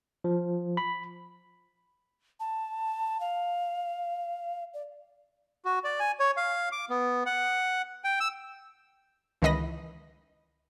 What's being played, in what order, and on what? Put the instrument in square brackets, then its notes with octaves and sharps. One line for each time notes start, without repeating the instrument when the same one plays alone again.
[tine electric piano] F3
B5
[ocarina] A5
F5
D5
[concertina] F#4
D5
G#5
C#5
F5
D6
B3
F#5
G5
E6
[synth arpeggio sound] C#2 D#3 E3 D#5 B5 A#6